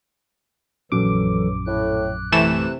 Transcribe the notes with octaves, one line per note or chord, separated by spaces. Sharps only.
A#1 F#2 E3 F#3 A4 D6
A2 F#6
C3 E3 A3 E7